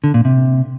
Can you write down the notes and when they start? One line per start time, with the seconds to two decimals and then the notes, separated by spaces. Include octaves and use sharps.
0.04 D3
0.14 A#2
0.25 C3